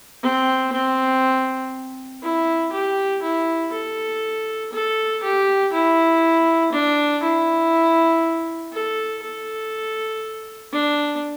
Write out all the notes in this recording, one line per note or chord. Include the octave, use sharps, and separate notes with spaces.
C4
C4
E4
G4
E4
A4
A4
G4
E4
D4
E4
A4
A4
D4